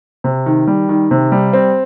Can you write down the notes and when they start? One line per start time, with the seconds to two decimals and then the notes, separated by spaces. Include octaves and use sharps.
0.24 C3
0.46 D#3
0.67 G3
0.89 D#3
1.11 C3
1.32 G3
1.53 C4